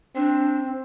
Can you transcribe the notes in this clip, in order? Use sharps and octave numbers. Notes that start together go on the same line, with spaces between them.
C4 D4